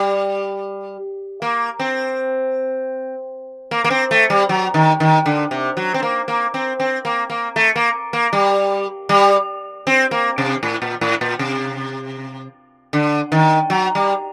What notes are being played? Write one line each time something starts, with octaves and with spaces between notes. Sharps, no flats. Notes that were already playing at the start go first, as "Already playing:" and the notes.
Already playing: G3
A#3
C4
A#3
A#3
C4
A3
G3
F#3
D#3
D#3
D3
C3
F#3
C4
A#3
A#3
C4
C4
A#3
A#3
A3
A#3
A#3
G3
G3
C4
A#3
C3
A2
A#2
A2
A#2
C3
D3
D#3
F#3
G3